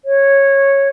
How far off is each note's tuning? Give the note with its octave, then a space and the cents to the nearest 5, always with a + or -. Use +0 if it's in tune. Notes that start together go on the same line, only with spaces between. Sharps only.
C#5 -10